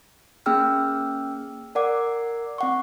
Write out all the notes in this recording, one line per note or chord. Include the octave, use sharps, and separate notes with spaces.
A#3 C#4 G#4 G5 E6 F6
A#4 D5 F#5 D6
C4 F#5 C#6